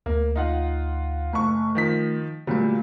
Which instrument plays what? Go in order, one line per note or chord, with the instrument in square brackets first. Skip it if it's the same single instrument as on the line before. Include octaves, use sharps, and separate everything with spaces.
[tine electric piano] D2 [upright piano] A#3
[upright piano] D#4 F4 F#5
[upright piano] F#1 C#6 [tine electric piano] A3
[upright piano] D#3 F3 B6
[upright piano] A#2 F#3 G3 [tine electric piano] D3 A3 A#3